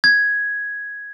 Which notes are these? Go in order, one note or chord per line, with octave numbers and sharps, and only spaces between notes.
G#6